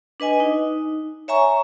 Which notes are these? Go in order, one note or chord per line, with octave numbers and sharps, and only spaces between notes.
D4 B4 D#5 G#5
D#4
C#5 E5 G#5 A#5 C#6